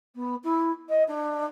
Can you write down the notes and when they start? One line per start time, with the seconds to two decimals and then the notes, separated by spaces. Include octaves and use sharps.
0.15 B3
0.43 E4
0.89 D#5
1.08 D4